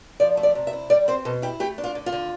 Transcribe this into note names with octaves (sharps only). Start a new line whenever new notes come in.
F3 D5
A3
D5
C3
E5
E4
G3 D5
C4 C5
B2 A4
E4 G4
A3 G4
D4
F4
D3
F4
D3